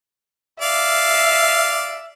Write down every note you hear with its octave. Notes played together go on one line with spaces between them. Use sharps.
D5 E5 F5